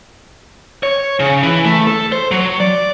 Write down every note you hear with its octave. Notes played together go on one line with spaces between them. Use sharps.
C#5
C#3
E3
A3
A4
C5
F#3
D5